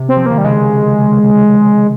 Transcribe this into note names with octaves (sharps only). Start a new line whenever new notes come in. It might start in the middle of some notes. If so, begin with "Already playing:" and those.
Already playing: C3
C4
F3
D#3 A#3
G3
C#3 G#3